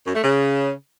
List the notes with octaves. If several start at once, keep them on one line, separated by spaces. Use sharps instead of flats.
F#2
A3
C#3